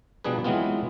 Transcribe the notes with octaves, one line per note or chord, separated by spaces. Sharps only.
B2 F3 G3 D4 G#4 B4
E3 F#3 G#3 B3 C4 F4